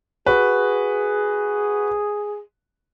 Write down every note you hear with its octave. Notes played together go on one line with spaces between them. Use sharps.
F#4 G#4 B4